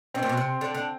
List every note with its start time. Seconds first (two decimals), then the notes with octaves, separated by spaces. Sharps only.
0.14 B2 C4
0.23 A#2
0.29 B2
0.37 C3
0.61 D3
0.75 D3